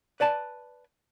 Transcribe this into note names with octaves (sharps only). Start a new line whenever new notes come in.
B4 D5 G#5 A5